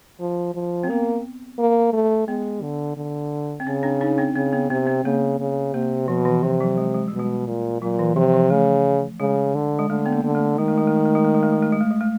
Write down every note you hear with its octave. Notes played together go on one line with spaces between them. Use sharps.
F3
F3
C4
A#3 B3
A#3
A3
G#3 B3
D3
D3
C4
C#3 C#4
C4 D4
C#4 D#4
C4 D4
C#3 C4
B3
C3 C4
C4
C#3 A#3
C#3
C3 A#3
B2 F3
E3
C3 F3
F#3
G#3
G#3
B2 G3
G#3
A#2
A#2 F#3
E3
C3 F3
F3
C#3 A3
C#3 G#3
D3
G#3
D3 A3
B3
A#3
D3
A3
D#3 G#3
A3
G#3
A3
G#3
A3
G#3
A3
G#3
A3
G#3
A3
G#3
A3
G#3
A3